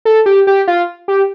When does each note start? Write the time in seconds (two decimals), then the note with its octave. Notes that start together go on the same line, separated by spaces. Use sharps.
0.05 A4
0.26 G4
0.47 G4
0.68 F4
1.08 G4